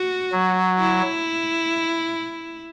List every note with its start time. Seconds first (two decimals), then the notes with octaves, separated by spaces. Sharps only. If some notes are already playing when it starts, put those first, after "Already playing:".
Already playing: F#4
0.32 F#3
0.79 E4